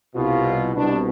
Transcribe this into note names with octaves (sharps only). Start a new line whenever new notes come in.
C2 B2 F4
C2 B2 D4